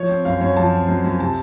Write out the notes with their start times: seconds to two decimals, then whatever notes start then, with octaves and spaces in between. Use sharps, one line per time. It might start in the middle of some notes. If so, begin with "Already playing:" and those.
Already playing: F3 C#5
0.09 C4
0.25 F#2 F5
0.41 F#2 C#5
0.57 F3 A5
0.73 C4
0.88 F#2
1.04 F#2
1.20 C3 A5